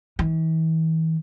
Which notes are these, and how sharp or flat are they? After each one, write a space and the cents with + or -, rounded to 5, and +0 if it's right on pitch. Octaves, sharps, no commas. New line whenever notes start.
E3 -40